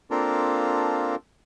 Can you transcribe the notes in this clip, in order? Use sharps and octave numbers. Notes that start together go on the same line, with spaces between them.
A#3 C4 D4 F4 A4 A#4